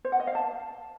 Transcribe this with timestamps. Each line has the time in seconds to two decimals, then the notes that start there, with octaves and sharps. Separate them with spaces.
0.05 C5
0.12 F#5
0.20 D#5
0.27 F5
0.35 A5